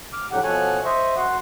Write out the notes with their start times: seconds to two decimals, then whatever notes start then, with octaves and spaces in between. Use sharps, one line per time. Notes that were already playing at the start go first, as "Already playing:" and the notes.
0.13 D6 F6
0.31 F2 A2 D3 F#3 G4 F#5
0.44 B2 F3 A4 C#5 G#5 F#6
0.85 C5 D#5 E5 C#6
1.16 F#2 F#4 F#5 C6